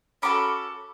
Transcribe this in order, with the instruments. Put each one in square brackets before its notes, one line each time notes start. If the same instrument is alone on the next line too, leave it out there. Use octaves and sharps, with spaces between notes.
[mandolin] C#4 F#4 A4 B5 D6